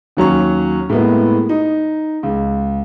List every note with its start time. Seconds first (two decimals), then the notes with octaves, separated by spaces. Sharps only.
0.17 D#2 F#3 C#4 C#6
0.89 A2 G#3 A#3 B3 E4
1.49 D#4
2.23 C#2